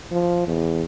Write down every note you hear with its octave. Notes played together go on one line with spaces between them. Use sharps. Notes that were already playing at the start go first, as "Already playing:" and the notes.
F3
E2